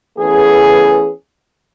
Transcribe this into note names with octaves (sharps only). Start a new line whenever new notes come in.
E3 A3 B3 C#4 G#4